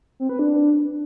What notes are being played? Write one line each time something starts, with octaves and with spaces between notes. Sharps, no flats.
C4
B4
D4